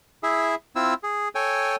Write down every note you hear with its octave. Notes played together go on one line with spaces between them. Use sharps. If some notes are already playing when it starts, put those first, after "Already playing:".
E4 G#4 E5
C4 E4 F4 E6
G#4
A4 C#5 G5 G#5